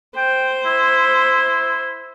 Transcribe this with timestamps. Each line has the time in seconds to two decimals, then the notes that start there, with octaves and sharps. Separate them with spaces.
0.17 C5 G5
0.65 E4